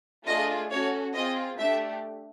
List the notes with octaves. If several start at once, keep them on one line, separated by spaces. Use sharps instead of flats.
A3 D4 F4 G#4 D#5
C#4 F#4 A4 C#5
C4 F4 G#4 D#5
A3 D4 G4 E5